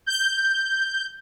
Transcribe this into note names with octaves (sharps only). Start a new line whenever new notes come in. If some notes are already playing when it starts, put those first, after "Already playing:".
G6